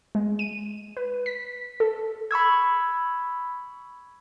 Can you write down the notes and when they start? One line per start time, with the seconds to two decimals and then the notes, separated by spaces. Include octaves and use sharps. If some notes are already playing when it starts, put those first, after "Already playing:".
0.15 G#3
0.39 D#7
0.97 B4
1.26 B6
1.80 A4
2.31 B5 C#6 E6 G#6